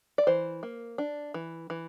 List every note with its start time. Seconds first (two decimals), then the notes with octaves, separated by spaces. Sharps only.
0.18 D5
0.27 E3 C5
0.63 A#3
0.98 D4
1.34 E3
1.70 E3